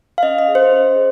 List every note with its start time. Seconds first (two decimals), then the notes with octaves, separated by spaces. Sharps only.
0.18 F5
0.23 C#4 D#5
0.38 D#5
0.48 G#4
0.55 C5
0.73 C#4
0.96 G#4